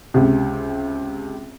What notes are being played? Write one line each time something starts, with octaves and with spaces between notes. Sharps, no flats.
C#2 C3